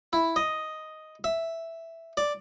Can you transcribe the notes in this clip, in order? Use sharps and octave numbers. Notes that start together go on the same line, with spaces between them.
E4
D#5
E5
D5